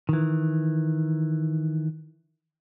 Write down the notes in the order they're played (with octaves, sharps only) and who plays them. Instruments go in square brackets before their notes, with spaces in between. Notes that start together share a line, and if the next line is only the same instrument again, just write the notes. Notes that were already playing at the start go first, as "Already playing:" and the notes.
[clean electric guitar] D#3 E3